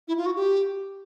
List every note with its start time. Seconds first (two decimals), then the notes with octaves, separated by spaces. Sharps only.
0.08 E4
0.18 F4
0.26 F#4
0.36 G4